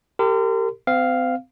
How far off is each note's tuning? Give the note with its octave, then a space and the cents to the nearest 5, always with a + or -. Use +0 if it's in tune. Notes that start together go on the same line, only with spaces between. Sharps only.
G4 +0 A#4 -35 C6 -40
C4 -35 F5 +0